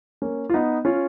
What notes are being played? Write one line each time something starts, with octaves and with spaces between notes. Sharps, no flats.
A#3 C#4
F4
B3 D#4
C#4 F4